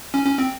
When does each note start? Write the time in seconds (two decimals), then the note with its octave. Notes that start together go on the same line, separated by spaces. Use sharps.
0.14 C#4
0.26 C#4
0.38 C4